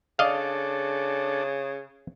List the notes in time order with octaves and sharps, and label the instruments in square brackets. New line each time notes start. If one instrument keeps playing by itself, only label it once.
[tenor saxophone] C#3 [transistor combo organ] D4 A4 [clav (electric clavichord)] D5 D#5 F5